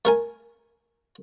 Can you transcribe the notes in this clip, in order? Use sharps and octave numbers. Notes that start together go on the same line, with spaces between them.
A3 A#4 G#5